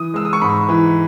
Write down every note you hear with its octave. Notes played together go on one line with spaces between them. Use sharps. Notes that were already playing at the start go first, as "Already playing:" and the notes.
Already playing: E3 D#6
G#3 E6
D#6
C#6
G#2 B5
E3